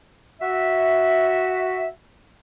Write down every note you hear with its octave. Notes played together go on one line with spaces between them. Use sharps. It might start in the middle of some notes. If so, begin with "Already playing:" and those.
F#4 E5